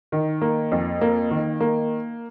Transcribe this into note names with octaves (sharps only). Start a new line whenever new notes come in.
D#3
A#3
F2
A#3
D#3
A#3